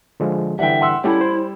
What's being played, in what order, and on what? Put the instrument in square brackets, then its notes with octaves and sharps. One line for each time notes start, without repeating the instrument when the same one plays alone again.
[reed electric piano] D3 F3 G#3
[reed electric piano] D3 E3 G3 [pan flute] E5 [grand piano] F#5 G5
[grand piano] F#5 C6 E6
[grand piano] G3 [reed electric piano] C#4 G4 A4 [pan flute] E4
[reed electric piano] C5